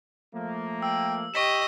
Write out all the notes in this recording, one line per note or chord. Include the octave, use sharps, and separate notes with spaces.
F3 A3 A#3
G5 E6
G4 D#5 C#6 B6 E7